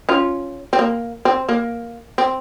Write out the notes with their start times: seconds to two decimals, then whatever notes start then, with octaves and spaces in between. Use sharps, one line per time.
0.09 C#4 F4
0.73 C4
0.79 A#3
1.25 C4
1.49 A#3
2.18 C4